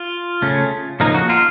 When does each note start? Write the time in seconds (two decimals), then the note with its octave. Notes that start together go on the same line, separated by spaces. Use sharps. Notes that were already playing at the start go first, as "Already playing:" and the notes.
Already playing: F4
0.42 C#3 A3 C#4
1.00 C#3 F3 A#3 D#4
1.15 F#4
1.29 F4